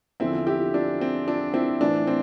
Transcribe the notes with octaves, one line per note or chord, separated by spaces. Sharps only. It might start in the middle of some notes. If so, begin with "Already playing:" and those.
E2 D3 F3 C4 E4
E4 G4
D4
C4
D4
C4 E4
A2 E3 D4
C4